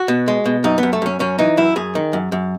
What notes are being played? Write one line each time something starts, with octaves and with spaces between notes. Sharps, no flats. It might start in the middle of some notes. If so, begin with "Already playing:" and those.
Already playing: F#4
B2
G#3
B2
F#2 D#4
B3
F#2
A3
F#2 C#4
F#2 C#4
E3 D#4
F#2 E4
F#2 G#4
D#3
F#2
F#2